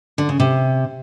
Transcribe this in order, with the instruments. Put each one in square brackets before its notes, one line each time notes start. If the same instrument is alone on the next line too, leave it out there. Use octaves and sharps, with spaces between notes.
[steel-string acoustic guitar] D3
C#3
C3